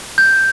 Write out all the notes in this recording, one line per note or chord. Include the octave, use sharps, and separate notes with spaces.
G6